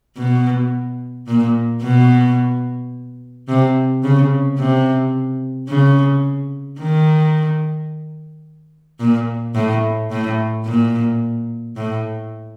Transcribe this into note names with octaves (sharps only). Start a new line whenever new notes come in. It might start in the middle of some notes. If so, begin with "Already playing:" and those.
B2
A#2
B2
C3
C#3
C3
C#3
D#3
A#2
A2
A2
A#2
A2